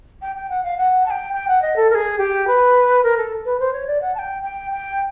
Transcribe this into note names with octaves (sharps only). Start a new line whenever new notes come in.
G5
G5
F#5
F5
F#5
A5
G5
G5
F#5
D#5
A4
A#4
G#4
G4
B4
A#4
A4
B4
C5
C#5
D5
F#5
A5
G5
G5
G5